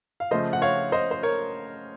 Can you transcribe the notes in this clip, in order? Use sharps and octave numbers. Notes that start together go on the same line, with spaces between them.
F5
C#3 F3 A3 C5 D#5
F#5
C#5 F5
C5 D#5
C5
A#4 C#5